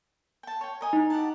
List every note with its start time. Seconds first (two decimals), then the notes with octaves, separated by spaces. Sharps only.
0.43 G5 A5
0.61 C#5 G5
0.81 A#4 D#5 G#5
0.93 D#4
1.10 G4 F#5 A5